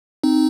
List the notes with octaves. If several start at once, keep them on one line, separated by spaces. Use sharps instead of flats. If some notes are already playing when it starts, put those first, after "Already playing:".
C4 D#4